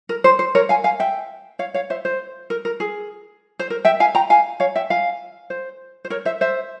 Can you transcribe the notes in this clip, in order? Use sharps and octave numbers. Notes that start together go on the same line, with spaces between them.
A#4
C5
C5
A#4 C#5
F5 G#5
F5 G#5
E5 G5
C#5 F5
C#5 F5
C5 E5
C5
A#4
A#4
G#4
C5
A#4
E5 G5
F5 G#5
G5 A#5
F5 G#5
C#5 F5
E5 G5
F5 G#5
C5
C5
A#4 C#5
C5 E5
C5 E5